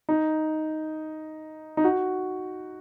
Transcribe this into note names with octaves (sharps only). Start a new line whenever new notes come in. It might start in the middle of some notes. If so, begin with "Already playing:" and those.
D#4
D#4
F#4